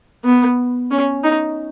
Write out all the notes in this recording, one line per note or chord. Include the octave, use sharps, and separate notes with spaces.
B3
C#4
D#4